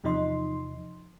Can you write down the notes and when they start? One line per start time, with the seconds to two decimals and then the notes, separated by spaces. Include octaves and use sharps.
0.04 E2 C3 F3 D#4 D#5 C6